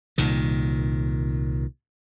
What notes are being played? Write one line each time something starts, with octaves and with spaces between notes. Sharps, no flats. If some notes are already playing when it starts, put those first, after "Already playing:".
C2 A#2 D#3